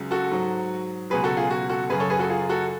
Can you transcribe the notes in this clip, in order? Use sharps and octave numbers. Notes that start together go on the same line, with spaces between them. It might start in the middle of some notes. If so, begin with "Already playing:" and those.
Already playing: C#2 C#3 F#3
F#4 A4
G#2 F#3
C#2 B2 F#3 G#4 B4
F#4 A4
F4 G#4
F#4
F#4 A4
F#2 C#3 F#3 G#4 B4
A4 C#5
G#4 B4
F#4 A4
F4 G#4
F#4 A4